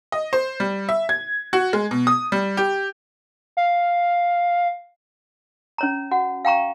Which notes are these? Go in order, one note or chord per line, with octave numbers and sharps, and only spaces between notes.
D#5
C5
G3
E5
G#6
F#4
G#3
B2
D#6
G3
G4
F5
C#4 C#5 A#5
F#4 F#5
F5 G5 A#5 C#6